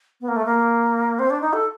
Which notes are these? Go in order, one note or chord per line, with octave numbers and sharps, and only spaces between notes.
B3
A#3
A3
A#3
C4
D4
D#4
A4